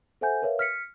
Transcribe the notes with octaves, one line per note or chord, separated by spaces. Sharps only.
A4 C5 E5 F#5 G#5 G6
A#4 B4 C#5 E5 F5
F6 B6 C#7